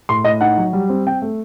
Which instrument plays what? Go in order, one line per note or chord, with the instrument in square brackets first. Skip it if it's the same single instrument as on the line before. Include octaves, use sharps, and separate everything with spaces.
[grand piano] A2 C6
A2 D#5
D#4 F#5
F#3
G3
C4
C4 G5
A3